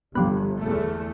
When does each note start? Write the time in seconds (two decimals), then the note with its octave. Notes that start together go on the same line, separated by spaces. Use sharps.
0.15 G1 F3 G3 B3
0.60 E2 A3